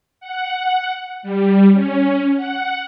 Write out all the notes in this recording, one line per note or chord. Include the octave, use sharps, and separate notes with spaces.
F#5
G3
C#4
F#5